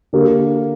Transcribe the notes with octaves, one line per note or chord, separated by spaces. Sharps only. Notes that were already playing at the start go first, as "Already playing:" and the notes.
D3 A#3 G4